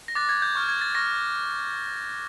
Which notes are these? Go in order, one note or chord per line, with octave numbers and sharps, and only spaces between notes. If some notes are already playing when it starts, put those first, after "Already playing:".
A#6
D6 F#6 A6
G#6
G6
C#6 F6
G6
G#6
A6
C#6 F6 A#6